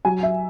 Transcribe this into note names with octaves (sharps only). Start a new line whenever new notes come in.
F#3 G#5
E5